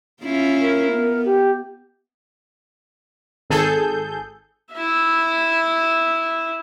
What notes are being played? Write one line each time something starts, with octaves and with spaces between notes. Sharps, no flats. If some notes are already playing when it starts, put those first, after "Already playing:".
C#4 E4 F4
A#4
B3
G4
G#1 G#4 A4 G6
E4 E5